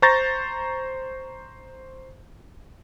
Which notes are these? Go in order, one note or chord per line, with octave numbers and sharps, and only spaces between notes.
C5 A#5 C#6 G6 A6 A#6